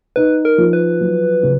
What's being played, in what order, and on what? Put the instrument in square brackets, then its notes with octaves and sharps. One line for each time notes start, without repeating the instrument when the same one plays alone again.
[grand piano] D#4 [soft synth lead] B4
[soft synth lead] A#4
[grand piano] F3
[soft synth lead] B4
[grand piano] F#3
C#3